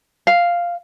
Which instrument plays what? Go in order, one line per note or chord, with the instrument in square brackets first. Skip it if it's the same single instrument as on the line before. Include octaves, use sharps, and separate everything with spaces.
[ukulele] F5